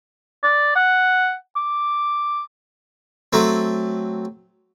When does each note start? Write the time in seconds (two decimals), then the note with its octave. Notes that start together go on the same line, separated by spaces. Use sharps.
0.43 D5
0.76 F#5
1.56 D6
3.33 F#3 A3 C4